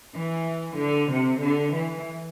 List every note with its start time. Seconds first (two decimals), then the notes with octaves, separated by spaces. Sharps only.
0.15 E3
0.78 D3
1.10 C3
1.43 D3
1.74 E3